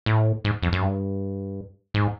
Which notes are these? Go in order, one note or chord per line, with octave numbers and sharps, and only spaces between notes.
A2
G#2
F2
F#2
G2
G#2